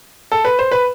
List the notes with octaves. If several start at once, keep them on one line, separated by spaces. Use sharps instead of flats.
A4
B4
C5
B4